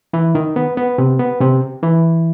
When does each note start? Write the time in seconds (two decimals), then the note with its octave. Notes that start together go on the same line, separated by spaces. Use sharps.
0.13 E3 E4
0.35 D#3 D#4
0.56 B3
0.77 B3
0.98 C3 C4
1.20 B3
1.41 C3 C4
1.83 E3 E4